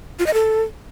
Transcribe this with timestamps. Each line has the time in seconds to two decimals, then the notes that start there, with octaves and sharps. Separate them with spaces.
0.19 F4
0.26 D#5
0.34 A4